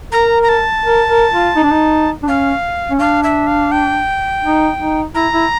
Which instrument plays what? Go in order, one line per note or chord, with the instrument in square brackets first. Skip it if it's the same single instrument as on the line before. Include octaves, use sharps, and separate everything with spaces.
[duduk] A#4 [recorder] A#5
[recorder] A#5
A5
[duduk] A#4
A#4
F4
D#4
D4
D#4
D4
[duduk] C#4 [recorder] F5
[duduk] C#4
[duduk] D4 [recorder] F5
[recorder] E5
F5
G5
[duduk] D#4
D#4
[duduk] E4 [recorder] A#5
[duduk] E4